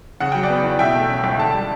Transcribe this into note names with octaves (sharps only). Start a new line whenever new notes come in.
C#3 F#5
F#3 G5
D5 F#5
B3
E2
B2 E5 G5
A3
C#4
C#2
D3 A5
G3